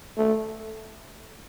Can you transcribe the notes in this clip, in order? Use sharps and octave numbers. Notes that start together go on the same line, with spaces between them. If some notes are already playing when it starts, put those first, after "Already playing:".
A3